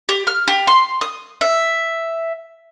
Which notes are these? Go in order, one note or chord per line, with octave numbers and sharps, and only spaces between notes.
G4
F6
G4
C6
D#6
E5